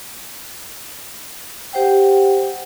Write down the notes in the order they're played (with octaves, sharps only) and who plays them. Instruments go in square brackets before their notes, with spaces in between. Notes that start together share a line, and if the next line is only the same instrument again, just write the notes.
[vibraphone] G4 C5 F#5 G5